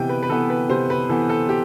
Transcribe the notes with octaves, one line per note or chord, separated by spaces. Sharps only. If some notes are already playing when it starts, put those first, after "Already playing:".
Already playing: C3 E3 B3 G5
B4
B4
E3 B3 A4
B4
C3 C5
B4
E3 B3 A4
A4
G4